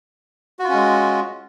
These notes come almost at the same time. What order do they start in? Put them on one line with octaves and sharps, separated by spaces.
F#4 F4 C#4 G#3